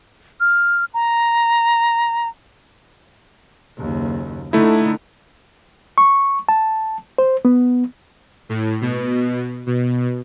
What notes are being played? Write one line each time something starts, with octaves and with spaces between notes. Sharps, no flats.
F6
A#5
F#1 D#2
D3 A3 D#4 E4
C#6
A5
C5
B3
A2
B2
B2